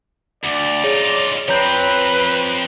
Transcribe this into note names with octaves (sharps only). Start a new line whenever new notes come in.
D2 D5
D#4 F4 G#4 C#5
F3 C4 B4 C#5 A#5 G6